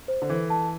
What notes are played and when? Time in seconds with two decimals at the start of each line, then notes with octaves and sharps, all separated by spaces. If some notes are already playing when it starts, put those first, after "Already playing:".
0.08 C5
0.22 D3
0.30 E3 A4
0.50 A5